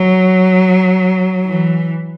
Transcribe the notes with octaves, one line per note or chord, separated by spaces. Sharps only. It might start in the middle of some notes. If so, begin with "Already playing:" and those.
Already playing: F#3
E3